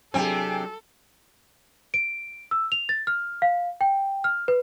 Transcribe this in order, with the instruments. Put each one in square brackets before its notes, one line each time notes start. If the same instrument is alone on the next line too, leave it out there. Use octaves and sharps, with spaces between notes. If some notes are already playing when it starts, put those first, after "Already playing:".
[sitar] C3 C4 [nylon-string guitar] F#3 D4 G#4 [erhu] A4 [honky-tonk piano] G5 G#5
[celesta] D7
E6
F7
A6
F6
F5
G5
F6
B4